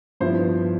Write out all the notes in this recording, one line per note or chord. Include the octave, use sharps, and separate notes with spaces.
G2 F3 B3 E4 C5